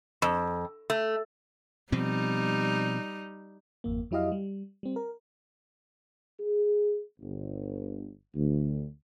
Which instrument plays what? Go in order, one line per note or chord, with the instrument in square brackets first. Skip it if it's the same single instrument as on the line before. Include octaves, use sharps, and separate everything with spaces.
[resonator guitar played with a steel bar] F2
A3
[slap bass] B2 F3 C4 [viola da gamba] G3 D#4
[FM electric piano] G#1 F2 A#3
F2 F#3 E4 G4 D#5 F5
G3
G3 C4
A#4
[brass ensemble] G#4
G1
D2